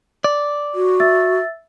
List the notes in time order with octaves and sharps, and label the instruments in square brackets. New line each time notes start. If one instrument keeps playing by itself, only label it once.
[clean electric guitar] D5
[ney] F#4
[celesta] E5 E6 A6